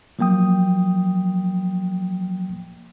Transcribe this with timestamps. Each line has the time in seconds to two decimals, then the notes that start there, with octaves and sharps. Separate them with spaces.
0.19 F3 F#3 A#3 G5 D#6